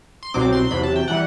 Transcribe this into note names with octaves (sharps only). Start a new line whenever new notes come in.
C6
C2 B2 F#3 C4 D6
C6
E2 C3 F#3 B5
A5
G5
E3 G3 F#5